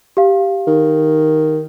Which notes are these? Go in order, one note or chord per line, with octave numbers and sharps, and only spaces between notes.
G4 F5
D#3